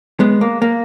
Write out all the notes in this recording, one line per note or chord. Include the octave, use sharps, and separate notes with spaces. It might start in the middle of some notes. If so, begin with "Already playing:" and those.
G#3 B3
A#3
A#3